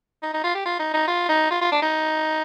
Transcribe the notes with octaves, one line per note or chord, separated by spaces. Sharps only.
D#4
D#4
F4
G4
F4
D#4
D#4
F4
D#4
F4
F4
D4
D#4